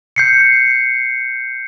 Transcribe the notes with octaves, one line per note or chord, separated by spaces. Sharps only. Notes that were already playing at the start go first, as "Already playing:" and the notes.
G6 C7 C#7